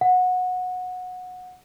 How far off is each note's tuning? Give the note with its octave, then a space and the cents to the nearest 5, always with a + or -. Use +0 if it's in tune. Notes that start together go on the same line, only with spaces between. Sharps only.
F#5 -20